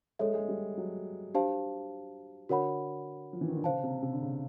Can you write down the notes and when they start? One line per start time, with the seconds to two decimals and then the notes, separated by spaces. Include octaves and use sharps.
0.19 G#3 A4 C#5 E5
0.34 G#3
0.48 G3
0.77 F#3
1.35 D4 G4 C5 F5 A5
2.49 D3 F#4 A#4 C#5 F#5 B5
3.33 F3
3.41 E3
3.48 D#3
3.57 D3
3.63 C#3 C5 F5 A5
3.83 C3
4.02 C3
4.13 D3
4.22 C#3